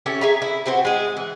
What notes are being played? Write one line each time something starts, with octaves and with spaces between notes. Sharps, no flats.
C#4 E4 G4 A4
G#4 E5 A#5
E4
B2 C4 F#4 C5
G#3 G#4
E3